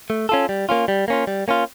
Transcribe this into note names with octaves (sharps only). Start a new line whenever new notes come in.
A3
C#4 F4 A4
G3
A#3 C#4 F4
G3
A#3 C#4 F4
G3
A#3 C#4 F4